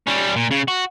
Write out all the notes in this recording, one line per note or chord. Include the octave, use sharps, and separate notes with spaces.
G3 C#4
A#2
C#3
F#4